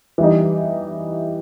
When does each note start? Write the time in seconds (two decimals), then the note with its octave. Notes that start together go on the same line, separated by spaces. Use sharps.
0.18 E3 G3 D#4